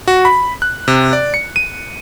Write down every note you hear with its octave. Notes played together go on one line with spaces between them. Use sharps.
F#4
B5
F#6
C3
D5
C#7
D#7